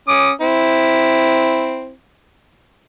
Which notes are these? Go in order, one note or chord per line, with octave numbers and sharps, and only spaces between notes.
C#4 D6 D#6
C4 E4